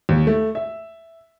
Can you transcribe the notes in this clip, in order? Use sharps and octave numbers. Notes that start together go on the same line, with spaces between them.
D#2
A3
E5